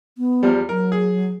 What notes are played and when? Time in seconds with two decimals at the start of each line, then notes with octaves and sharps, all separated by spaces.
0.18 B3
0.43 E2 F3 G3
0.69 F#3 A#4
0.92 G#4